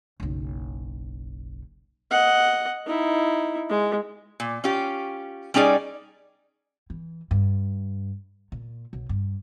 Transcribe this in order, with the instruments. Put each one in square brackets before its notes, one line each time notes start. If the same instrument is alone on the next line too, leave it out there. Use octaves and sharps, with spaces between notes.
[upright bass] F#1 B1
[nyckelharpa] D#5 F#5
D#4 E4
G#3
[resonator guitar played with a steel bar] A#2
C#4 F4 G4
G3 C#4 D#4 G#4 D5
[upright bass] E3
G2
A#2
B1
G2